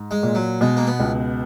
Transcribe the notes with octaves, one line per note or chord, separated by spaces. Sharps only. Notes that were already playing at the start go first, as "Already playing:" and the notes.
Already playing: G#2
G#3
A#2
F#3
B2 G#3
A#3
B3
C#2